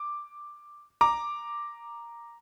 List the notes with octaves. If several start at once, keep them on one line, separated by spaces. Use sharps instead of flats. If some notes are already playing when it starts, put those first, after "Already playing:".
Already playing: D6
A#5 D6